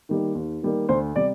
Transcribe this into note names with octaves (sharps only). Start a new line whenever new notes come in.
D#3 G3 A#3
D#2
D#3 G3 A#3
D2 C5
C3 G3 D5